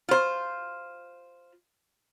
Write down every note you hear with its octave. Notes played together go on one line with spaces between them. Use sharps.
F4 C5